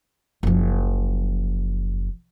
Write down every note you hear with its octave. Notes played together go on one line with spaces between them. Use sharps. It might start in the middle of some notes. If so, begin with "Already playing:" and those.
F#1 F3